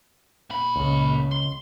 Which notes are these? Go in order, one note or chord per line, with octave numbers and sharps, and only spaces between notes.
A#2 B5
C#2 C#3
C6